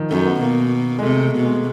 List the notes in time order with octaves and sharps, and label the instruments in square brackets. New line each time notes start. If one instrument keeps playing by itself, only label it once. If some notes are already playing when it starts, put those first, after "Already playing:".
Already playing: [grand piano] D#3 F3
[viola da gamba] F#2 [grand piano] A3
[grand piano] B3
[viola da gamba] B2 [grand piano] A#3
[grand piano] G#3
[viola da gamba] C3 [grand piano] A3
[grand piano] A3
[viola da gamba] B2
[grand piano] G#3